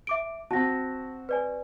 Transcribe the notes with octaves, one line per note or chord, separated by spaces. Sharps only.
E5 D6 D7
C4 F#4 A5 A#6
B4 D5 G#5